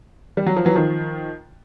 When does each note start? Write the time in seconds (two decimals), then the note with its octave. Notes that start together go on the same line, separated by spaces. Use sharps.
0.37 G3
0.46 F#3
0.57 F3
0.65 E3 F#3
0.75 D#3 F3